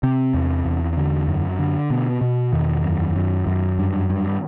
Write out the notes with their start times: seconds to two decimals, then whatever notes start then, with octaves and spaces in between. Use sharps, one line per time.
0.03 C3 C4
0.34 E2
0.66 E2
0.97 D3
1.28 F#2
1.59 D3
1.90 B2 B3
2.21 B2
2.53 E2 D#3
2.84 F#2
3.16 F#2
3.47 F#2
3.79 G2
4.10 G2